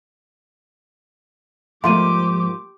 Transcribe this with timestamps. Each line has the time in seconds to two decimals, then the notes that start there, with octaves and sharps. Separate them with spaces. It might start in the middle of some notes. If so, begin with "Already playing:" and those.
1.84 G#2 F3 A3 A#3 G4 C6 D6 D#7